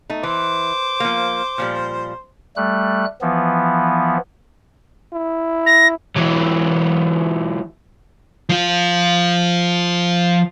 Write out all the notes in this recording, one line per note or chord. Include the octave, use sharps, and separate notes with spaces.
A3 D#4
E3 C5 D6
F3 A#3
A#2 F3 G3
G3 A3 F#6
E3 F3 B3
E4
A#6
E3 F#3
F3 F4